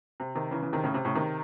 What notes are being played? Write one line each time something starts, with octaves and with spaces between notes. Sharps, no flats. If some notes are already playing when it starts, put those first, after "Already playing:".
C3
C3 D#3
C#3 E3
C#3 E3
C3 D#3
A2 C#3
C3
A2 C#3
C3 D#3